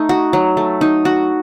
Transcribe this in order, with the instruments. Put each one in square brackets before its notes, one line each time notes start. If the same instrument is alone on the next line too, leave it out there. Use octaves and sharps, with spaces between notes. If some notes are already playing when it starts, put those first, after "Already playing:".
Already playing: [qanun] A3 D#4
F#4
F#3
A3
D#4
F#4